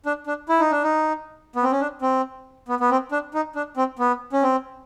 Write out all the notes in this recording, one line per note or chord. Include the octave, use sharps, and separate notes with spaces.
D4
D4
E4
D#4
D4
D#4
B3
C4
C#4
D4
C4
B3
B3
C4
D4
D#4
D4
C4
B3
C#4
C4